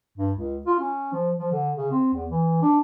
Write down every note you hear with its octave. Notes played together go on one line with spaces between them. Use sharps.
G2
C#2
F4
C#4
F3
F3
D3
C#3
C4
E2
E3
D4